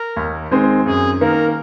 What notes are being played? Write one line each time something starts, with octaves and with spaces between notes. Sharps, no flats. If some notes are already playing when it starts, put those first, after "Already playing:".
Already playing: A#4
D#2
D#3 G#3 C4
F#2 G#4
D#3 A#3 A#4